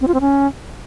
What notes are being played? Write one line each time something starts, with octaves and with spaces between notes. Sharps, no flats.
C4
F4
C4
C#4